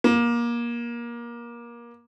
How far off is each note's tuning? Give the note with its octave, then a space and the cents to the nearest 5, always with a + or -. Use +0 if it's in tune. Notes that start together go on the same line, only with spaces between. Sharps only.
A#3 +25